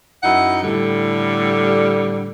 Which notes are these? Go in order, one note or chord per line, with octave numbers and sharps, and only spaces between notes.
F#2 D#4 E4 F#5
A2 D3 G3